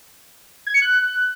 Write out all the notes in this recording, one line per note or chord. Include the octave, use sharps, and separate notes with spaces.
G#6
C#7
F#6